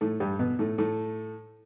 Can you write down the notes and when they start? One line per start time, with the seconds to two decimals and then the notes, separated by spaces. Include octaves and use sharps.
0.01 A2 A3
0.20 G2 G3
0.39 B2 B3
0.59 A2 A3
0.78 A2 A3